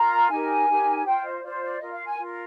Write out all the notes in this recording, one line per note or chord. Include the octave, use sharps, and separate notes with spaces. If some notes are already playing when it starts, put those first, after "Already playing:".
Already playing: F4 A#4 A#5
D#4 G4 A#4 G#5
D#4 G4 A#4
F4 C5 G5
D#5
F4 C5 D5
D5
F4 A#4 D#5
F5
G#5
F4 A#4